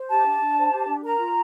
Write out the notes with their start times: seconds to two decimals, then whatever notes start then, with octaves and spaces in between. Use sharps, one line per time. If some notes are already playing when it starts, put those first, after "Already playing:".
Already playing: C5
0.10 G4 A5
0.26 D4
0.40 D4
0.57 C5
0.72 G4
0.87 D4
1.03 A#4 A#5
1.19 F4